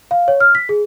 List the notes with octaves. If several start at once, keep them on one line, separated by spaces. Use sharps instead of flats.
F5
C#5
F6
B6
G#4